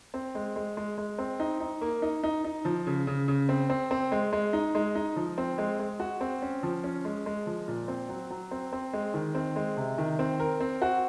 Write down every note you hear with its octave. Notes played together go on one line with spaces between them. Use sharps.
C4
G#3
G#3
G#3
G#3
C4
D#4
D#4
A#3
D#4
D#4
D#4
F3
C#3
C#3
C#3
C4
C4
C4
G#3
G#3
D#4
G#3
D#4
F3
C4
G#3
G#3
F#4
C4
C#4
F3
C#4
G#3
G#3
F3
A#2
C4
F#3
F#3
C4
C4
G#3
D#3
C4
G#3
C3
D#3
C4
A#4
C4
F#4